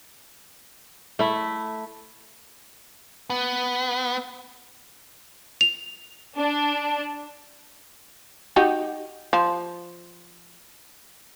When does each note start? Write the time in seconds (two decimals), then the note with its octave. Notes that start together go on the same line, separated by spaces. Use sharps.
1.19 A3 E4
3.30 B3
5.61 F7
6.36 D4
8.56 D#4 F#4 G4
9.33 F3